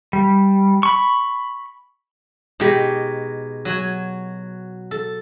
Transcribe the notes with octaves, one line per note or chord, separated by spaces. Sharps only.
G3
B5 C#6
B2 G#3 D#4 G4
F#3 F#4 G#5
A4